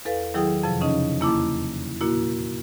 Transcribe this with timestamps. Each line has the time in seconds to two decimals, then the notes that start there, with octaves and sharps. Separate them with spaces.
0.05 E2 A4 B4 F5
0.34 D#3 F#3 E4 G#4 G5 D#6
0.64 F2 C3 F3
0.81 C#3 C#4 D#4 D#5
1.20 E2 A#3 E4 A5 D6
2.01 A#2 A#3 E4 F#4